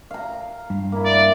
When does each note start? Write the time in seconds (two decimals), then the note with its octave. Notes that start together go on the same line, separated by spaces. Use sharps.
0.11 F5 A#5
0.70 G2
0.92 A#3 E4
1.05 D5